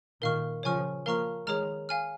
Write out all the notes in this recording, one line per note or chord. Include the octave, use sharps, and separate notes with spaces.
A#2 D#3 A#4 F5 C#6 F6
C#3 F3 C#5 G#5 C#6 F6
F3 A#3 A#4 F5 A#5 C#6 F6
D#3 G#3 G#4 C#5 A#5 F6
F5 G#5 F6